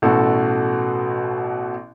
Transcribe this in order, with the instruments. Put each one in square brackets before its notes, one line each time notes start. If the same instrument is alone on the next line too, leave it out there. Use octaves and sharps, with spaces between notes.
[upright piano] A1 B2 F#4 A4